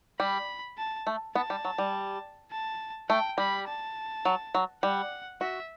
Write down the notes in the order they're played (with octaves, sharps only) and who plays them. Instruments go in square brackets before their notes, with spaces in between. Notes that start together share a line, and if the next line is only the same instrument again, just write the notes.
[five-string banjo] G3 [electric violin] B5
[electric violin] A5
[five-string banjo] A3
[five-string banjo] B3 [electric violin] A5
[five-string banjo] G3
F#3
G3
[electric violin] A5
[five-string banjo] A3 [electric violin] G5
[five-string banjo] G3 [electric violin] B5
[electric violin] A5
[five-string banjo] F#3
F#3
[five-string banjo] G3 [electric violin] F#5
[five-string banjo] F#4 [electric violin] E5